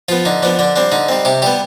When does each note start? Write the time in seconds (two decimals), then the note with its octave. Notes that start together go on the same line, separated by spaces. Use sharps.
0.09 F3 B3 F4
0.25 D3 D#4
0.43 F3 B3 D4
0.59 D3 D4
0.76 G3 C4 D4
0.92 D3 D#4
1.09 G3 C4
1.25 C3 G4
1.42 G3 B3 G4